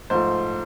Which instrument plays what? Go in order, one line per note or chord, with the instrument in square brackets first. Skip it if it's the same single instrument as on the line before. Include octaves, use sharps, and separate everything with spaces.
[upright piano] G#2 F3 A3 C5